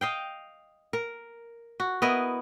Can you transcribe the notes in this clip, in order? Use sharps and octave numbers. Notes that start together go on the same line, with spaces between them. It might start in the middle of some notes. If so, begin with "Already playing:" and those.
D#5 F5 G5
A#4
F#4
B3 E4 A#4 D#5